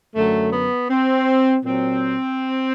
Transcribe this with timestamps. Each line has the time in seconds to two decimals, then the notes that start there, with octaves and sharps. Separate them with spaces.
0.14 F#2 D3 F#3 A3
0.52 B3
0.90 C4
1.64 A#2 F#3 C4